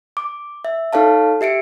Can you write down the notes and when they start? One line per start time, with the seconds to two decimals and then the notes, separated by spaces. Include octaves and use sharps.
0.17 D6
0.65 E5
0.93 D#4 A4 C#5 F5 A5
1.41 G4 E5 C#7 D7